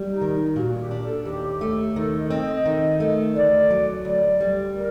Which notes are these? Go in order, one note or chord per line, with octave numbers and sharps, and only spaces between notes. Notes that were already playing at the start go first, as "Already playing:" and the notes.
Already playing: G3
D#4
D#3
D#4
A#2 F#4
G4
D4
A4
D#2 G4
A3
D#3 A4
D#5
C4
D#5
D#3
A3
D2 D5
F#3
D2 D5
G3
A#4